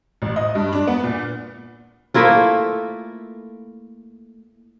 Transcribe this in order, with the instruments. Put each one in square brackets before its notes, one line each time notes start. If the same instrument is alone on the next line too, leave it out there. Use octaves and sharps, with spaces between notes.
[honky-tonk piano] A1
D#5
G2
D4
B3
A#2
[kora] A3 A#3 E4 F4